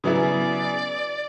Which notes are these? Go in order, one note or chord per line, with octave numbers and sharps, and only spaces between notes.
C#3 F#3 B3 E4 G#4 D5